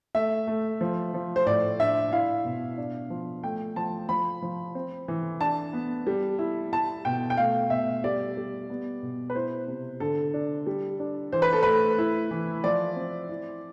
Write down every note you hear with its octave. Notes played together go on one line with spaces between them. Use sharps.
A3 E5
A3
F3
F3
C5
A2 D5
D4 E5
E4 F5
B2
D4
F3
A3 G5
F3 A5
F3 B5
F3
C4
E3
D4 A5
B3
G3
E4
E4 A5
B2 G5
G5
A3 F5
B2 E5
G3 D5
G3
B3
B2
B4
E4 C5
C3
D3 A4
D4
G3
D4
E3 C5
B4
A4
A3 B4
E4
E3
F3 D5
C4
E4